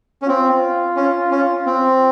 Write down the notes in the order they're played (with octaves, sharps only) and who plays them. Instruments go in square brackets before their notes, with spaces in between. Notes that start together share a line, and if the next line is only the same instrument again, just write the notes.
[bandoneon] C#4
[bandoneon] C4 [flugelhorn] F4
[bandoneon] C#4
C#4
C4